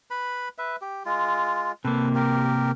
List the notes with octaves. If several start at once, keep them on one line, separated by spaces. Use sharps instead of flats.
B4 B5
B4 E5
G4
G#3 F4
C3 A#3 A4 B4
G4 A#4